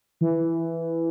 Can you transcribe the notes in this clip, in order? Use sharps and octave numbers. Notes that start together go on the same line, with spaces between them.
E3